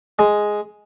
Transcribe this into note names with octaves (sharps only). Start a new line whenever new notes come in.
G#3